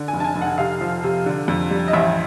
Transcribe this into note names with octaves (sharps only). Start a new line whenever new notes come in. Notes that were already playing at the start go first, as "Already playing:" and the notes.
Already playing: D3
G#5
F1
A5
G#5
F1
F#5
C3 F5
F3
C3
D3
F2
G3
D#5
A1 E5